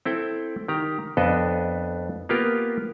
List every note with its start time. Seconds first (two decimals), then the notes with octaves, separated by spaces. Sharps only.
0.05 C4 E4 A4 G5
0.68 D#3 G4 A#5
1.17 F2 B3 D4 A4 B4 D#5
2.29 A#3 B3 F4 G4 A#4